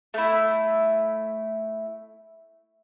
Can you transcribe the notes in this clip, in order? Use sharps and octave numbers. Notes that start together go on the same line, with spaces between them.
A3 E4